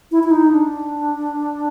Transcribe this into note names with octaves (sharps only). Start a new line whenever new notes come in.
E4
E4
D#4
D4